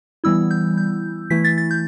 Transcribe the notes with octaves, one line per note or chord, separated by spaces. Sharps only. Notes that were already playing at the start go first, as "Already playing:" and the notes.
E3 G3 B3 E4 E6
G6
G6
E3 A3 E4 B6
A6
A6
G6